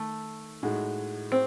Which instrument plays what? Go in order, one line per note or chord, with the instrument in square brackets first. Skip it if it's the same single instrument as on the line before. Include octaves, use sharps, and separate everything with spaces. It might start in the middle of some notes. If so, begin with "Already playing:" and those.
Already playing: [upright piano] D#3 [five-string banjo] A3
[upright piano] A2 G#3 D#4 F#4
[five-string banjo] C4